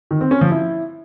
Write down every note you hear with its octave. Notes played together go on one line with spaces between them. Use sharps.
D#3
C4
C#4
F3
E4